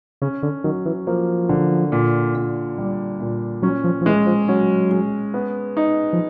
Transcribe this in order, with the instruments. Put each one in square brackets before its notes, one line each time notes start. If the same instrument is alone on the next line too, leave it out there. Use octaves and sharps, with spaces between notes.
[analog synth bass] C#3 [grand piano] C#4
[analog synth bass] D3
[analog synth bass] D#3 [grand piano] F#3
[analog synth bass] E3
[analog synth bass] F3 [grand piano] A#3
[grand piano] D3
A#2
A#2
G3
A#2
[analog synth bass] F#3 [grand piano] C#4
[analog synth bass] F3
F3
[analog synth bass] E3 [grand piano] G#3
[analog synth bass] F3
[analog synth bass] F#3 [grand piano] C#4
[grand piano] G#3
B3
D#4
[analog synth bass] F3